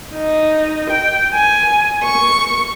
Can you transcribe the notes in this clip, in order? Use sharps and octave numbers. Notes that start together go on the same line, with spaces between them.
D#4
G5
G#5
C#6